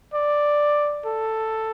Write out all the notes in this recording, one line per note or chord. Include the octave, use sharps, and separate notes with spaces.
D5
A4